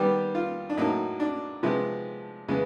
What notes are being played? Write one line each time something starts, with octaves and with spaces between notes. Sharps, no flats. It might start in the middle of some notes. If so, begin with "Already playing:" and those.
Already playing: D#3 G3 B3 G4
F4
D4
A2 F#3 A#3 D#4
D4
C3 F3 G#3 B3
C#3 E3 G#3 B3